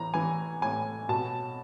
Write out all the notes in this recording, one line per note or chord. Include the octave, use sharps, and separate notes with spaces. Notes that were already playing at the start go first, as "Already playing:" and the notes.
Already playing: A2 E3 A#5
E3 G#5
A2 G#5
B2 A5